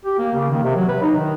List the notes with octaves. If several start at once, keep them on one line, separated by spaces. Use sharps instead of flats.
G4
A#3
C#3
D#3
C3
F#3
B4
D#4
D#3